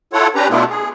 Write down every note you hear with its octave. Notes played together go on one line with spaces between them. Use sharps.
E4 F4 A4 C#5 F#5
C#4 D4 G4 B4 A#5
B2 A3 B3 D4 E4 F4
G#4